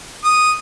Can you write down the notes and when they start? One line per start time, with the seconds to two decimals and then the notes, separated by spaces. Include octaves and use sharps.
0.24 D#6